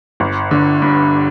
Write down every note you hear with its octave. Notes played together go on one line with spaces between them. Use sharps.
G1
D3
G2